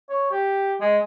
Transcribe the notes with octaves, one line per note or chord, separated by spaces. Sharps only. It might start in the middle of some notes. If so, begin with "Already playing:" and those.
C#5
G4
G#3